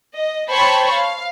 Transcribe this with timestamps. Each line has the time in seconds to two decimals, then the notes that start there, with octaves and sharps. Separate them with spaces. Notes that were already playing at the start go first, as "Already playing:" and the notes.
0.13 D#5
0.50 C5 C#5 G5 A5 B5 C#6
0.91 F5